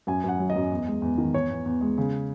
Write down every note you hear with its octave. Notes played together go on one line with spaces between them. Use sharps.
F#2 G#5
F#2 F#5
F#3
D#5
F#2
E2
G#3
E2
D#3
E2 C#5
E2
E2
G#3
C#3